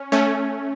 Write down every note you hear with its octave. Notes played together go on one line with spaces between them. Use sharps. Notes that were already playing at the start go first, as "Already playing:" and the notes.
Already playing: C#4
A3 C#4